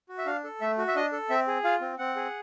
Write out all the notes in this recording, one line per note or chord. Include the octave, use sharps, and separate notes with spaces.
F#4
E5
D4 F5
A4
A3 E5
F#4
E5
D4 D#5
A4
C4 E5
G#4
F4 F5
C4
C4 F#5
G#4